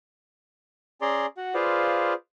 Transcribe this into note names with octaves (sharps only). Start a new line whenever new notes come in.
C#4 G#4 D5 A#5 C6
F#4 F#5
F4 G#4 B4 C5 D5 F5